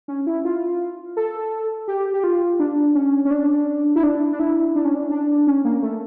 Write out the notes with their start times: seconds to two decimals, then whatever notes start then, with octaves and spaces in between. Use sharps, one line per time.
0.08 C#4
0.27 E4
0.45 F4
1.17 A4
1.88 G4
2.13 G4
2.24 F4
2.59 D4
2.95 C#4
3.25 C#4
3.31 D4
3.96 E4
4.03 D4
4.32 D4
4.39 E4
4.75 D4
4.85 C#4
4.96 D4
5.11 D4
5.47 C#4
5.65 A#3
5.82 A3